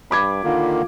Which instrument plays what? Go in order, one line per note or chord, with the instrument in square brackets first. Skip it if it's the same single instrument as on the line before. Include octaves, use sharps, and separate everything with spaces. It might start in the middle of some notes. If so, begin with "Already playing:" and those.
[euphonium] G2 [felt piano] B5 D6 G#6
[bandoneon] D3 D#3 A#3 [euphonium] F4